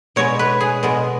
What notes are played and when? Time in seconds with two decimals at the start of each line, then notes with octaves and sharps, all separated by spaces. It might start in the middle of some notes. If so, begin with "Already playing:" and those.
0.16 B2 G#3 B3 C#5
0.39 B4
0.61 G#4
0.83 B2 G#3 B3